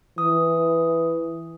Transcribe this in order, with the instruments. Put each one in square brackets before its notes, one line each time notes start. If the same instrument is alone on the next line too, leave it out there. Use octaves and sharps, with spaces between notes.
[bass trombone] E3 [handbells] D#6